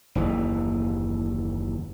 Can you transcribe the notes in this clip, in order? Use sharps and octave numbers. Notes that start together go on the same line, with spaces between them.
F#1 D#2 E3